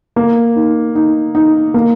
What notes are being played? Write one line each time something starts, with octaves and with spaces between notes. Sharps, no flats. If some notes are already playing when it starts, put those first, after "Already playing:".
A#3
D#4
D#4
D#4
A#3